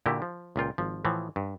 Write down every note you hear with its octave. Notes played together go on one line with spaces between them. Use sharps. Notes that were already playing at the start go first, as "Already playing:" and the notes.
A#2 D3 E4 F#4 G4
F3
C#2 A#2 F4 G5
G#1 F3
A2 E3 F3
G2